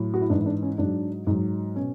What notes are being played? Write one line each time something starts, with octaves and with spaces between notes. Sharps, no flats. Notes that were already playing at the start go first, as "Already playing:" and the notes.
Already playing: A2 F#3
F#4
E4
G#2 E3 D4
E4
D4
C#4
G#2 F#3 D4
G#2 F#3
B2 C#4